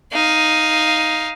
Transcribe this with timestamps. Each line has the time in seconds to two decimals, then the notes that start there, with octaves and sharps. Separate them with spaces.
0.13 D#4 F5